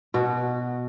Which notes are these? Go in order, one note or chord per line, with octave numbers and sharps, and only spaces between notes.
B2 F#4